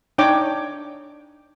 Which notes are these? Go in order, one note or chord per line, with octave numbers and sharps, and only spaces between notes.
D4 D#4 C#5 G5 D6